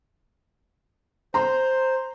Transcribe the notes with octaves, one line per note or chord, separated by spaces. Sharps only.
C5 A#5 C6